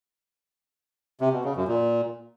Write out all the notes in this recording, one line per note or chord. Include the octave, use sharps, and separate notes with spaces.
C3
B2
C#3
F#2
A#2